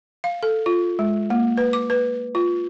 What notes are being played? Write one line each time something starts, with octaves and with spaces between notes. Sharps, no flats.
F5
A4
F4
G#3
A#3
B4
D6
B4
F4